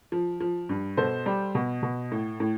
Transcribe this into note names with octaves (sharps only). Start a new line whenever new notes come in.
F3
F3
G2
B2 A4 C5
G3
B2
B2
A2
A2